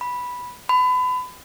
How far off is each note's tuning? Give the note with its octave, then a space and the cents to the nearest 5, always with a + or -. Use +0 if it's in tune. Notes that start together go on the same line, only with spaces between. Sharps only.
B5 -5
B5 +30